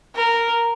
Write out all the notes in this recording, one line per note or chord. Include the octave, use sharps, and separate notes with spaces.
A#4